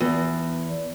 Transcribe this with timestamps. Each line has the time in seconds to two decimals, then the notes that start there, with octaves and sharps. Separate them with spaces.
0.01 E2